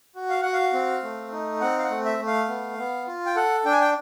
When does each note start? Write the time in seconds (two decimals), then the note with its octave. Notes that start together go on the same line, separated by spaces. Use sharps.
0.16 F#4
0.30 F5
0.42 F#4 F#5
0.53 F5
0.73 C4
1.03 A3
1.32 D#4
1.61 C4 F#5
1.78 F5
1.84 F#5
1.90 A3
2.05 E5
2.19 A3
2.27 F5
2.48 B3
2.78 B3
3.07 F4
3.26 G5
3.36 A4 F#5
3.65 D4 G5
3.72 G#5
3.81 G5